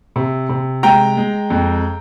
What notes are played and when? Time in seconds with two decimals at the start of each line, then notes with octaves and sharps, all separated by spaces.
0.16 C3
0.49 C3
0.83 G#3 G5 A#5
1.17 G#3
1.50 F2